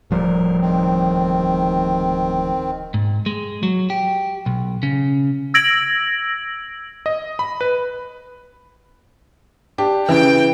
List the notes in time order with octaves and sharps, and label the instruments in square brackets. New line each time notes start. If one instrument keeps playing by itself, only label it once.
[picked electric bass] D1 F3 G3 [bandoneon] A#4
[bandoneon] D#3 C4
[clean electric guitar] G#2
G#3
F#3
G4
B1
C#3
[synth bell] E6 G#6 A#6 D7 F#7
[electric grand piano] D#5
B5
B4
[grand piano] D4 G4
[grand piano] C#3 E3 [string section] G5